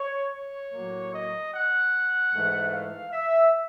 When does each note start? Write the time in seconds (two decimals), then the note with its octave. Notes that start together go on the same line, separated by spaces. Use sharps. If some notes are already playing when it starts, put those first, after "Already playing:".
Already playing: C#5
0.32 C#5
0.72 A2 F#3 A#3
1.12 D#5
1.52 F#5
2.32 G#2 E3 A3
2.72 F5
3.12 E5